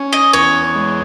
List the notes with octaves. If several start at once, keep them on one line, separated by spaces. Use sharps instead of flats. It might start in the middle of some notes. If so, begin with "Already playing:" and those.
Already playing: C#4
D#5
E2 C#5
G#3